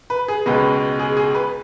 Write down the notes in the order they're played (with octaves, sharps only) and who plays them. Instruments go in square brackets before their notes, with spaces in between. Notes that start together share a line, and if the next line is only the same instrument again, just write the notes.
[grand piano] B4
G#4
C#2 B2 G#3 B4
G#4
G#4
B4